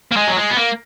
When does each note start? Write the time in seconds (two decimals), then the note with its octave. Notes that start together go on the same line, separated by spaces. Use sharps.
0.12 A#3
0.17 G#3
0.28 F#3
0.37 G#3
0.50 B3
0.57 A#3